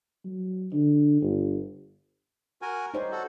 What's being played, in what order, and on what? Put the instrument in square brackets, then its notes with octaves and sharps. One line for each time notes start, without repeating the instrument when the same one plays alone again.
[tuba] F#3
D3
G1
[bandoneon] F#4 A#4 G#5
[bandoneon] G3 [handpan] D#4 C5 C#5
[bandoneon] F#4 A4